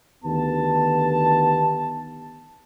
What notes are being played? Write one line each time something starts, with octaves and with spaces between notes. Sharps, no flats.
D2 D#3 B3 G4 A5